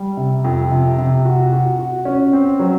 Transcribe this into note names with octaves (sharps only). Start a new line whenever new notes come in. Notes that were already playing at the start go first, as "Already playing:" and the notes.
Already playing: G3
C3
F2
C3
C3
F#4
F#4
F#4
C#4
C4
F#3